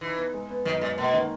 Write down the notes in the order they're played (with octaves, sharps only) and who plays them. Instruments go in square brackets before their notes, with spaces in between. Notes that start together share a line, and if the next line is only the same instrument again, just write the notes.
[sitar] E3 [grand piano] D#4
[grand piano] B3
G#3
B3
[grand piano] F#2 [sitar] D#3
[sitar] A#2 [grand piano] G#3
[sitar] B2 [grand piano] A#3
[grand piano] D#3